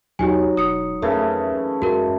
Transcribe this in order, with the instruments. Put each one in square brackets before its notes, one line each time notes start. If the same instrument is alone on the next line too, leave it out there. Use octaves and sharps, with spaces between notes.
[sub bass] E2 [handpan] F#3 D#4 F#4 [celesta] G4 G#5
[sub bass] E1 [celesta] D#6 C#7
[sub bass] F2 [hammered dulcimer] C#3 E3 A3 [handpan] A#4
[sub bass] F#2 [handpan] G#3 [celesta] F#4 A#4